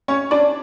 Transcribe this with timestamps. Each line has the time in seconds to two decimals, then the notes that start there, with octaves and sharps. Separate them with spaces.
0.08 C#4 C#5
0.31 D4 D5